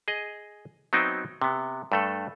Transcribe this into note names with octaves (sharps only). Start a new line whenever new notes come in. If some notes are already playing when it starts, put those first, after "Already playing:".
G#4 D#5
F#3 B3 C4 D#4 E5 G5
C3 B3
G2 A3 A4